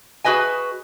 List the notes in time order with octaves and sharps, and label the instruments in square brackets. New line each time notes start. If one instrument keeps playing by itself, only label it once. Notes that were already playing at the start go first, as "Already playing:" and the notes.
[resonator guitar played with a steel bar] F#4 G#4 B4 D#5 G#5